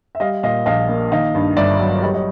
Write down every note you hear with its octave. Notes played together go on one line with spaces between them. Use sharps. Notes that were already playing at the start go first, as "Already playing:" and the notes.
E5
G3 D#5 F5
A#2 D#5 F5
A#1 D#5 F5
A#3
D#3 D#5 F5
G2
G1 D5 E5
F#3
G3 C#5 D#5
C#5 D#5